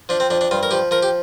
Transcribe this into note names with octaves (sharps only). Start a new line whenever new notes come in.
F3 D4
C4
F2 D4
D4
G2 F4
A#4
F3 G4
F3 A#4
G4